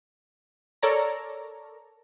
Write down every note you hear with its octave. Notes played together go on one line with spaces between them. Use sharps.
A4 A#4 C#5 D5 A#5